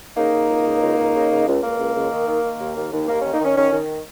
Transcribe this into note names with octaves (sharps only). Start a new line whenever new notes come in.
C#3 A#3 D#4
C#3
C#2
C#2
C#2
C#2
C#3
C#3
C#2
C#2 A#3
C#2
C#2
D#3
D#3
D#3
D#2
D#2
D#2
D#2 A#3
D#3 C#4
A#3 D#4
D#3 C#4
D#3 C#4
D#3